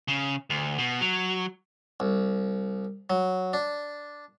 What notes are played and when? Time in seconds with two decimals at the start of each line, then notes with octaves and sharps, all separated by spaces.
0.08 C#3
0.50 D2
0.78 B2
1.01 F#3
2.00 C2
3.10 F#3
3.53 D4